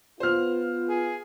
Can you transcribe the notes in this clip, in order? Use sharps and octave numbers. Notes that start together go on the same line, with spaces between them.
B3 F4 C5 F6
G#4